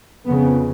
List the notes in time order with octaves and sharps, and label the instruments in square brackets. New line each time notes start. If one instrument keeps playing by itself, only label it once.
[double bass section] F2 C#3 B3